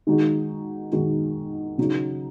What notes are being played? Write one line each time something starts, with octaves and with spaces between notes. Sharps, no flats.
D#3 G#3 D#4 F#4
D#3 G#3 D#4 F#4
C#3 F#3 D#4